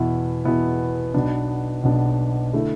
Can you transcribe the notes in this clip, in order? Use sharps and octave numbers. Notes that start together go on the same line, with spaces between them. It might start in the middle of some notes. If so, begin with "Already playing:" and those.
Already playing: E2 B2 B3 E4
E2 B2 B3 E4
B1 B2 B3 D4
B1 B2 B3 D4
D3 A3 E4